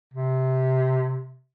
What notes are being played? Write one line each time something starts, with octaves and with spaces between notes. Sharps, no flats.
C3